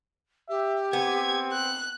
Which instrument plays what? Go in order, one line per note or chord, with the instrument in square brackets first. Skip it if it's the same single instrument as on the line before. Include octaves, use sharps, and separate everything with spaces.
[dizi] G4 [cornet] E5
[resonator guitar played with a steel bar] B3 [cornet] C4 [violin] G#5 G#6
[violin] F#6